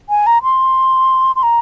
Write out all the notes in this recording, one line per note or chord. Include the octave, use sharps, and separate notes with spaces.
G#5
A#5
C6
C6
A#5